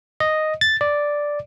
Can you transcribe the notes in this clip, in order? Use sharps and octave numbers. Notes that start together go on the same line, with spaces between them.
D#5
A6
D5